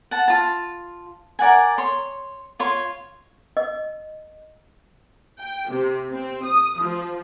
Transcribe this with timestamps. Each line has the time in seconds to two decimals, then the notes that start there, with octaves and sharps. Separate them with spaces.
0.11 F#5 A5
0.28 F4 A5
1.39 A#4 D5 F#5 G#5
1.78 C#5 C6
2.59 F4 C#5 C6
3.57 D#5
5.38 G5
5.69 C3
6.11 C4
6.44 D#6
6.80 F3